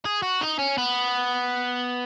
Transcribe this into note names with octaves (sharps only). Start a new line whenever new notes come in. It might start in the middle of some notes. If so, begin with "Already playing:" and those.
G#4
F#4
D#4
C#4
B3